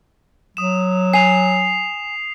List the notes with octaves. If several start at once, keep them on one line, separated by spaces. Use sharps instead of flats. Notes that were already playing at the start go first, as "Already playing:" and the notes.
F#3 D#6 E7
G#5 C7 F7